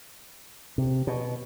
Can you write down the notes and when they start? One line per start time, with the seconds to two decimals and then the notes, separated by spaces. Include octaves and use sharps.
0.78 C3
1.07 B2